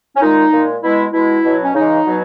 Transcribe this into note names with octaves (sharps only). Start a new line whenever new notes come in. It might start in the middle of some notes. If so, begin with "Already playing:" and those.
C#4
A#2 G#3 D#4
A#2 G#3
B2 G#3 E4
B2 G#3 E4
B2 F#3
C#4
C#3 E3 G#3 D#4
B2 F#3